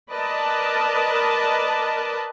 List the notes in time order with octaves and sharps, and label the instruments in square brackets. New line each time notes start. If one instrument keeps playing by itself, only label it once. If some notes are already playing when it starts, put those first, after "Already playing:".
[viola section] A#4 B4 D5 D#5 A5